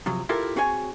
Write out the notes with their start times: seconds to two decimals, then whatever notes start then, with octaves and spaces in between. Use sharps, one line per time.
0.06 C3 F3 F#3
0.29 E4 F4 G4 A4 A#4
0.56 C4 F#4 G#4 C#5 G5 G#5